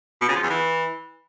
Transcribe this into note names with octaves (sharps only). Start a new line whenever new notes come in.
B2
C#3
F3
E2
E3